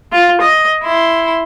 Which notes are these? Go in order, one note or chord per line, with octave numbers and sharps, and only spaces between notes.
F4
D#5
E4 C6